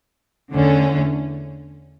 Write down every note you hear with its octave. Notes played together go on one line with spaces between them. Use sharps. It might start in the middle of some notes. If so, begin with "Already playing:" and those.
E2 D3 A3 C#4